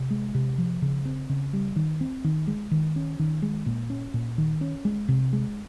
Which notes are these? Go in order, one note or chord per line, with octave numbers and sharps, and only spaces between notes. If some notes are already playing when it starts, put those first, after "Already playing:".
Already playing: C3
G#3
C3
F3
C#3
C4
C#3
G3
D#3
C4
D#3
G#3
D#3
C#4
D#3
G#3
A#2
C#4
A#2
D#3
C#4
G#3
C3
G#3